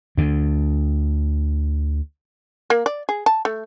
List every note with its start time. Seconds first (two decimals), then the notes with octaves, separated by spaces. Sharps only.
0.17 D2 D3
2.70 A#3
2.86 D5
3.09 G#4
3.26 A5
3.45 A3